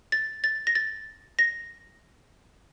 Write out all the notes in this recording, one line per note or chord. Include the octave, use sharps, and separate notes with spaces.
A6
A6
A#6
A6
A#6